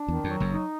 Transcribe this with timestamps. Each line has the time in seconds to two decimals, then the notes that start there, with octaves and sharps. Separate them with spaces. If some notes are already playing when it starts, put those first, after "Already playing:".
Already playing: D4
0.08 E2 D#3
0.24 F2
0.30 F#3
0.40 F#1 F#2
0.51 D#4